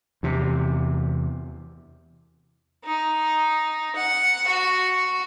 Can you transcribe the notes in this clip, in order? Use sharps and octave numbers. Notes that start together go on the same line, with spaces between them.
E2 C3
D#4
F#5
F#4